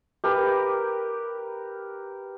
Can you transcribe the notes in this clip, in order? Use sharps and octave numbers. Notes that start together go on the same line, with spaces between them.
G4 A#4 B4